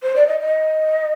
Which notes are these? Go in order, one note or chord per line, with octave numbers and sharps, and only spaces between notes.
C5
D5
D#5
D#5